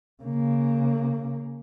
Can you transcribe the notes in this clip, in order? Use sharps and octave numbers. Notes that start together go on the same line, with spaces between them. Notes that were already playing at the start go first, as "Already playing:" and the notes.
C#3 A#3